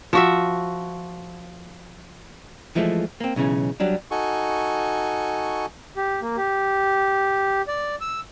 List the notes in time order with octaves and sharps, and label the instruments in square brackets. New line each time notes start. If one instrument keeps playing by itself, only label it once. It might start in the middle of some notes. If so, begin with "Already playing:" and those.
[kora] F3 F#4 E5
[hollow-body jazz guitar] E3 F3 G#3 A3
A#3 C4
B1 C#3 E3 C#4
F#3 G3 D4
[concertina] D#4 F#4 A4 G#5 C#6
[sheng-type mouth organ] G4
A#3
G4
D5
E6